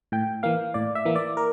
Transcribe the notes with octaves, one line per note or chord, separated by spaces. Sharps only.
A2 G5
E3 A#3 F5
A2 D5
E5
E3 A#3
D5
A#4